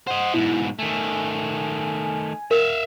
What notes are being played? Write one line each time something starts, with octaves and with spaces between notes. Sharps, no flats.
C5 D#5 F#5
G#2 B2 E4
D#3 A3 G#5
A#4 E5 F5